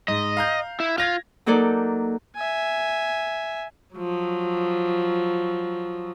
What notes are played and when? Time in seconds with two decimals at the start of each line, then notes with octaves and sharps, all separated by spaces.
0.08 G#2 D#5
0.37 F5 A#5 G6
0.80 E4
0.98 F4 G#6 A#6 F7
1.46 F#3 A#3 D#4 A4 D5
2.36 E5 G#5
3.96 F3 F#3